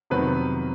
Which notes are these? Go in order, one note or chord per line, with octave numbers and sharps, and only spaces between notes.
F2 C3 D#3 F#3 B3 B4